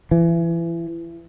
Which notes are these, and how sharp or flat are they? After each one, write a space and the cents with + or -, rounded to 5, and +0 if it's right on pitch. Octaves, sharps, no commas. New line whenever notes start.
E3 +30